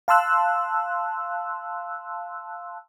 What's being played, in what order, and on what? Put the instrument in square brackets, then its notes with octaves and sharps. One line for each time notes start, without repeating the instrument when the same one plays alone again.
[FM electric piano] F5 A5 C6 E6 F#6